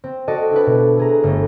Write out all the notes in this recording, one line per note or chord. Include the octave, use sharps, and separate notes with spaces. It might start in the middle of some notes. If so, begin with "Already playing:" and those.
C4
F#4 A4 D5 D#5 A5
D4 E4 A4 B4
B2
A3 G#4 A#5
G1 A3